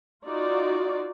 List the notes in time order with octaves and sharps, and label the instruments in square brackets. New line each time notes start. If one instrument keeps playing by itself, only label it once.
[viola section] D#4 F4 F#4 D5